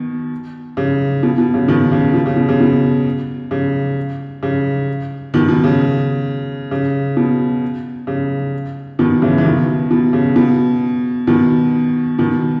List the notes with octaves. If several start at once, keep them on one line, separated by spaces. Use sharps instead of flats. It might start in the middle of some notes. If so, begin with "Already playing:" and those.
Already playing: B2 D#3
C#3
B2
B2
C#3
B2 D#3
C#3
B2
C#3
B2
C#3
B2
C#3
C#3
B2 D#3
B2
C#3
C#3
B2
C#3
B2 D#3
C#3 E3
E3
B2 D#3
B2
C#3
B2
B2 D#3
B2 D#3